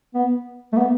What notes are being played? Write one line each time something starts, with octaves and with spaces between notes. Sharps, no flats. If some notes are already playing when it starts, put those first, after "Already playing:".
B3
A3
B3